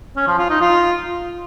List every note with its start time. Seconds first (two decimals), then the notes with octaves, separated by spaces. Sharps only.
0.16 C#4
0.28 F3
0.39 F4
0.50 D#4
0.61 F4